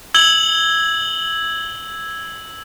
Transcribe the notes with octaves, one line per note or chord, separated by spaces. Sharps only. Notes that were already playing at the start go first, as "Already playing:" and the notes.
E6 G#6 F#7 G7